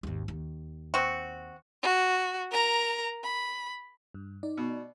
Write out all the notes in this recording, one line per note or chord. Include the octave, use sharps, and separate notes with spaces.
G#1 D#2
D#2
C4 F#4
F#4
A#4 A#5
B5
G2
D#4 D5
B2